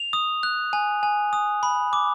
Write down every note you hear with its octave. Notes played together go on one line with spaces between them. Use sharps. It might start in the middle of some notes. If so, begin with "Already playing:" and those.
Already playing: F7
D#6
F#6
G#5
G#5
D#6
B5
D6